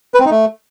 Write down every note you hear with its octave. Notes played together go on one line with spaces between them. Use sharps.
B4
C4
D#4
A3